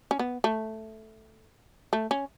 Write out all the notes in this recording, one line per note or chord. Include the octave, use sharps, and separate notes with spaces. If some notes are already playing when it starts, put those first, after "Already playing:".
C#4
B3
A3
A3
C#4